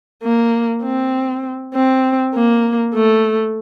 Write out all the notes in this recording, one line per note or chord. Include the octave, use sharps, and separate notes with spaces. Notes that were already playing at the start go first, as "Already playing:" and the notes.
A#3
C4
C4
A#3
A3